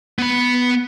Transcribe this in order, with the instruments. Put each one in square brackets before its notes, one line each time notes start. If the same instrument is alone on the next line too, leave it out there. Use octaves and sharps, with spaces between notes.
[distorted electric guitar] B3 B5